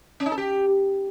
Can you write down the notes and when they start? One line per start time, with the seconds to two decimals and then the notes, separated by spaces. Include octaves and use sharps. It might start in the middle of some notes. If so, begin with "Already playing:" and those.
0.20 C#4
0.26 D#4
0.32 A4
0.38 G4